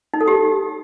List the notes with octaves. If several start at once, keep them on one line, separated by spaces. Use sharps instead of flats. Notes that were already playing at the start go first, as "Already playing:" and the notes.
D#4
A4
G4